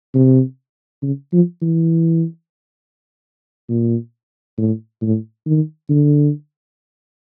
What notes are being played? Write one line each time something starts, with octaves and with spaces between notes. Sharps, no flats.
C3
C#3
F3
E3
A#2
A2
A2
D#3
D3